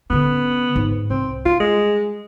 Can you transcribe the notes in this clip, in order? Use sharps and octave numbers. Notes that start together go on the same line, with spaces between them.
D3 B3 C#4
G#2
C2 C4
G3 F4
G#3